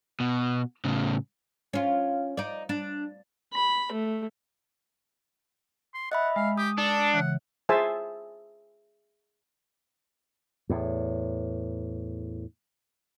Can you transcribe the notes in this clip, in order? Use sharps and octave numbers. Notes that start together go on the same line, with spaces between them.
B2
A2 C#3
C#4 F4
D#4 D5
D4
B5
A3
C6
D#5 E5 F#5 B5
G#3 F5
G4 D#6
D4 A4
C#3 E3 F#5
G#4 C5 E5 G#5 A5
E2 A2